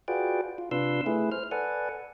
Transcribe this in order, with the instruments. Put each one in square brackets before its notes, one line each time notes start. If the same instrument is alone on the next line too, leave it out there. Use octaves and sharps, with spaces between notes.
[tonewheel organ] F4 F#4 G#4 B4 D5 G5
F4
C3 D4 F4 B4 C6 E6
A3 E4 G#4 B4
C5 F6
A4 B4 D5 F#5 G#5